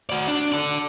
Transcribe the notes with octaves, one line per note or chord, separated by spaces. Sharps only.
F#4 D5
D4
A4 D5